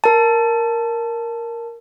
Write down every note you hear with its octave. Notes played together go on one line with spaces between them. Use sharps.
A#4 A5